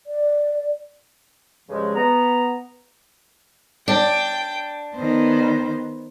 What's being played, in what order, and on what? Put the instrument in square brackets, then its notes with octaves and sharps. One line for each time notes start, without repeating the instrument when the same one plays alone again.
[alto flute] D5
[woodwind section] G2 C#3 F3 G#3
B3 A#5
[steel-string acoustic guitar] D4 [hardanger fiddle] G5
[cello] D#3 B3 [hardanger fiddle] C5